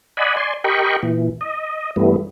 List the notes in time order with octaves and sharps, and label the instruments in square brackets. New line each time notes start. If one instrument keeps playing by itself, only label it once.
[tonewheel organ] D5 D#5 F#5 G#5 B5
D5 G#5 C6
G4 A#4 D#5 G5 B5 C#6
A#2 E3
D#5
G2 E3 G3 A3 B3